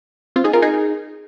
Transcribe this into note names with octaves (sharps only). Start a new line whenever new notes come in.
C4 F4
D#4 G#4
F4 A#4
D#4 G#4